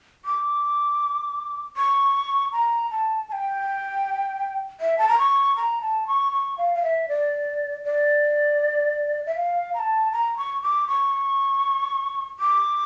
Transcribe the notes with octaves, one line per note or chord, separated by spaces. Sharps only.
D6
C#6
A#5
A5
A5
G5
E5
A5
A#5
C#6
A#5
A5
C#6
C#6
F5
F5
E5
D5
D5
E5
F5
A#5
A5
A#5
C#6
D6
C#6
D6